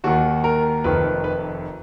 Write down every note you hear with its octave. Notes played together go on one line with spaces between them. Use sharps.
D#2 D#3 F#4
A#4
F1 F2 D#3 B4
B4